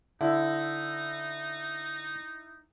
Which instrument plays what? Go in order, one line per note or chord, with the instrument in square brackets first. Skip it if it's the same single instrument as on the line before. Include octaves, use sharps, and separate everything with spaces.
[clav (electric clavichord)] D3 [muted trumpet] D#4 [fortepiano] E4